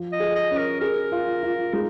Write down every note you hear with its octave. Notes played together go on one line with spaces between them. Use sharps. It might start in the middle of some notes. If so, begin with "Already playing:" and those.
Already playing: F3
D#5
G#4
D#5
C#4
A#4
G#4 A#4
F4
F4
G#3 D#4